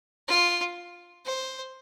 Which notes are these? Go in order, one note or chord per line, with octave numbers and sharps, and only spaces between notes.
F4
C5